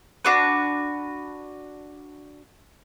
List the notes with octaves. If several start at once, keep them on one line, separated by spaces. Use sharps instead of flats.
D4 F#4 B4